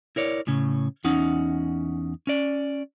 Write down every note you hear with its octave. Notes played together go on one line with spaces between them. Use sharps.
E4 A#4 C#5 D5
A2 C#3 C#4
E2 C#4 D#4 F#5
C#4 D5